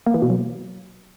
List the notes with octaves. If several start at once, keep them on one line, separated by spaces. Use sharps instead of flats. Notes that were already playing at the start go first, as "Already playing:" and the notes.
A#3
E3
B2
F#3